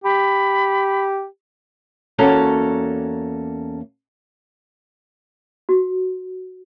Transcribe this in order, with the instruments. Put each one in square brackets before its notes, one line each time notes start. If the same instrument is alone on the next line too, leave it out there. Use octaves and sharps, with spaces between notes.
[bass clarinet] G4 [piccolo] B5
[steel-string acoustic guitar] E2 A#3 C#4 F#4 A4 A#5
[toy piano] F#4